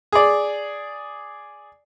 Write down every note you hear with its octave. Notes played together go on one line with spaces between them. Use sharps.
G#4 D5